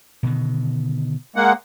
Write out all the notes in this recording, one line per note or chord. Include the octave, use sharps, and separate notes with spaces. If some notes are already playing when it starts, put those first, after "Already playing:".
B2 D3 D#3
G#3 A#3 F#5